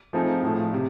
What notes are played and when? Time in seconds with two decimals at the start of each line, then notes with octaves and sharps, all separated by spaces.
0.13 F3 A3 C4 D#4 G#4
0.42 A2 F3 A3
0.73 C3